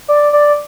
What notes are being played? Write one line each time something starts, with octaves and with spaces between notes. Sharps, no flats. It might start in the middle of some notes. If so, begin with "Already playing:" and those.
D5
D5